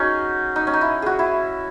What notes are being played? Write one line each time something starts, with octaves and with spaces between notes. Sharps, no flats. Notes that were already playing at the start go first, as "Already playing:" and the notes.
Already playing: C#4 D#4 F#4 G#4
D#4
C#4
D#4
E4
F#4 G#4
E4